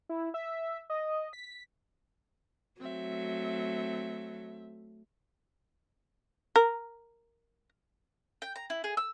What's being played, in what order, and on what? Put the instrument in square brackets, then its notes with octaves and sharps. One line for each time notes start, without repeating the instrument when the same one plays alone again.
[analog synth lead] E4
E5
D#5
B6
[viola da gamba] F#3 A3 [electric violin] C4 E5
[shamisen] A#4
[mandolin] G5
A#5
E4
G#4
E6